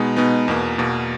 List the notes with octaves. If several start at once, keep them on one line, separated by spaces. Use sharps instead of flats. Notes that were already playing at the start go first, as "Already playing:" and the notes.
Already playing: B2 G#3 B3 D#4
B2 G#3 B3 D#4
E2 B2 A#3
E2 B2 A#3